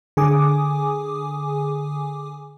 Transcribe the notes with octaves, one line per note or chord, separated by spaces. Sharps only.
D3 G#4 G#5 D6 D#6